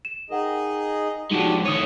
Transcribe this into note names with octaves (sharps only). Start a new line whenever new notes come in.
E7
D#4 G#4 A#4 D#5 F#5 G5
F3 G#3 D4 D#4 F#4 G4
A2 D#3 C#5 D#6 D#7